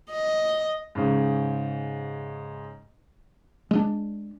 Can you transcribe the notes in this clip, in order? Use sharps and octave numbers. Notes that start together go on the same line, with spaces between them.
D#5
G#2 C#3
G#3 A3 D4